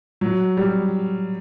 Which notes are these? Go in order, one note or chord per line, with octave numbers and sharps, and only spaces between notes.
F#3
G3